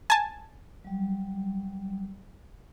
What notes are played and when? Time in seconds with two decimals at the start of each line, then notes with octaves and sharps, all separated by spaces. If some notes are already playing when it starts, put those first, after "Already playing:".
0.10 G#5 A5
0.85 F#3 G3